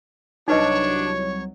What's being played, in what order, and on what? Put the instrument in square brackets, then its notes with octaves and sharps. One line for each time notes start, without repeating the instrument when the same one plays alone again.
[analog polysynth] C2 F#3 [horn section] D4 [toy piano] D#4 B4 D#5 [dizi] C#5